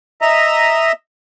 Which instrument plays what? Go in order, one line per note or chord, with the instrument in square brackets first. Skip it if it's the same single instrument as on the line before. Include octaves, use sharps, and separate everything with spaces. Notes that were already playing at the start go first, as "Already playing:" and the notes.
[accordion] D#5 E5 A#5